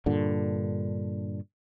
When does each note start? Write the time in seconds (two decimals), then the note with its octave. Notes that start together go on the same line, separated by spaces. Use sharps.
0.06 G2 A#2 D3